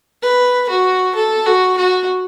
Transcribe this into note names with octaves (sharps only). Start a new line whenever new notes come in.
B4
F#4
A4
F#4
F#4